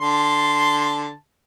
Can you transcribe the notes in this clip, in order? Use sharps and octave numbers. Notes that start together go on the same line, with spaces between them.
D3 A5 C6